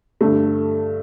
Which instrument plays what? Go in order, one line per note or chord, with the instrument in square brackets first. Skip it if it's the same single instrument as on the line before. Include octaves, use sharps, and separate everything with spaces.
[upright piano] G2 D3 A3